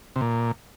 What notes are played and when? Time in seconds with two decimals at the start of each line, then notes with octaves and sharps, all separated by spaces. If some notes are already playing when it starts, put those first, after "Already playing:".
0.16 C3
0.21 A#2